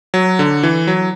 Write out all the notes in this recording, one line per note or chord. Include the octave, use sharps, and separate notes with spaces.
F#3
D3
E3
F#3